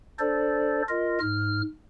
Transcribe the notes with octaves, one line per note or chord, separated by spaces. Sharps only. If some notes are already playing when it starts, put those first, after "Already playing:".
D4 A4 C5 D5
F4 A#4 D#5
G#2 F6